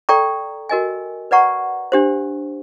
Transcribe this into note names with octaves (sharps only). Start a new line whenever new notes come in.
A4 D5 G5 A#5 C#6
F#4 A#4 D#5 G#5
B4 D5 F#5 A#5 C#6
D4 G4 C5